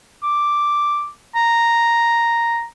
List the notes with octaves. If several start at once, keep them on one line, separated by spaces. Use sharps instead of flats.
D6
A#5